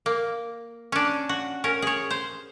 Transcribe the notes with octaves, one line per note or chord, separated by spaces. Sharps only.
A#3
C#4 D4
F#4
C#4 A#4
G#4 C#5
C5